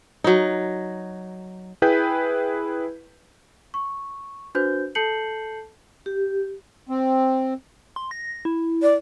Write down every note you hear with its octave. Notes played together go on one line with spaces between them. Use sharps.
F#3 D#4
E4 G#4 B4 G5 G6 B6
C#6
D4 F#4 B4 C5 G6
A4 A5 G6 C7 C#7 F#7
G4
C4
C6
A#6
E4
D5